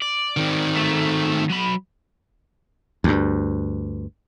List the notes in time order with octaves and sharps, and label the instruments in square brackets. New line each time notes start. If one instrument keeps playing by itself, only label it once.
[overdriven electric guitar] D5
[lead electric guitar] D#3 C4
[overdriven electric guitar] A3
F#3 B5
[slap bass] D2 G2